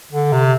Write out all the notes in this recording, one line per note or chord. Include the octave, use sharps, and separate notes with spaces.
D3
C3